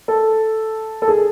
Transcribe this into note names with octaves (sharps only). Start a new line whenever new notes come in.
A4
A4
G#4